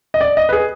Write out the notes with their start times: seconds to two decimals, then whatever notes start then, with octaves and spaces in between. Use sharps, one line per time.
0.14 D#5
0.21 D5
0.37 D#5
0.49 B4
0.53 G#4